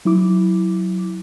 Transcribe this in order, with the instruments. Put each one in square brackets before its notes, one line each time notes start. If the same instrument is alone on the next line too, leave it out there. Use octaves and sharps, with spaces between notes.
[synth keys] F#3 E4 D6